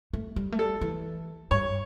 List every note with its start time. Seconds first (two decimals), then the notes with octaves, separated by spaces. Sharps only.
0.13 A3
0.36 G3
0.52 A3
0.59 G3 A4
0.81 E3
1.51 G2 C#5